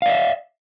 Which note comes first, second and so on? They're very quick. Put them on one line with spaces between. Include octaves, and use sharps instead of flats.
F5 D5 E5